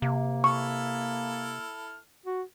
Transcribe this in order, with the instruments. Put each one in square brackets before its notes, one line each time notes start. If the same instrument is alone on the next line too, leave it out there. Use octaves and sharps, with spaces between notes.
[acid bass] C3 [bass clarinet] A#3
[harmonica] E4 A4 F6 [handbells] C#6
[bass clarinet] F#4